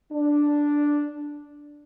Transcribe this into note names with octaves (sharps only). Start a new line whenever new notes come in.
D4